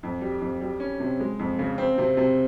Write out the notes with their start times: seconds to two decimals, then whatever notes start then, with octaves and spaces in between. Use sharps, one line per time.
0.03 F2
0.21 G3
0.41 F2
0.61 G3
0.80 C#4
1.00 C3
1.20 G#3
1.39 F2
1.59 C#3
1.78 C4
1.98 C3
2.17 C3